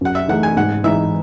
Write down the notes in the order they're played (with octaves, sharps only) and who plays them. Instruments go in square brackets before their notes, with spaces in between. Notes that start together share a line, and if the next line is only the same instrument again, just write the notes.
[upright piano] F#2 [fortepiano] F#5
[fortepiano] E5
[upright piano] E3 A3 D#4 G#4 [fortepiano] F#5
[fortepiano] G#5
[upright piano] G#2 [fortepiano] F#5
[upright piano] E3 G#3 D#4 [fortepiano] E5